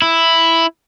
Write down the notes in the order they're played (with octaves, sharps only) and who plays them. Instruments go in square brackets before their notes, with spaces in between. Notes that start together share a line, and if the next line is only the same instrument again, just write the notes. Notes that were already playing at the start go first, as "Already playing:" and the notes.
[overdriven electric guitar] E4